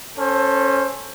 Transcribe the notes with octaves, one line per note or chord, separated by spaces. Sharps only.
C#4 A4 C5